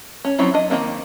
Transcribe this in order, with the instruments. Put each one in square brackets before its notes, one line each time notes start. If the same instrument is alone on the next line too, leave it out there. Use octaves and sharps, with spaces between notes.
[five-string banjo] C#4
F3 F#3 C4 C#4 E4
D4 D#5
D#3 G3 A#3 C4